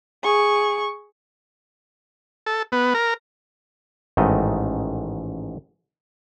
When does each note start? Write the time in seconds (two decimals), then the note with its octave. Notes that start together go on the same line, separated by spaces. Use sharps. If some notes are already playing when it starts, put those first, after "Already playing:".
0.23 G#4 C#6
2.46 A4
2.72 B3
2.94 A#4
4.17 A1 G#2 D#3 A3 D#5